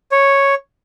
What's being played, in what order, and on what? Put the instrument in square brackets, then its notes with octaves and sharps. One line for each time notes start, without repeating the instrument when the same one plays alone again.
[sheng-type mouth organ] C#5